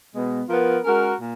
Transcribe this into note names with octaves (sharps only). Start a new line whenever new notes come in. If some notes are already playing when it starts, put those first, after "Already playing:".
B2 G#3 B3
F3 B3 F4 A#4
G#3 C#4 F#4 A#4
A#2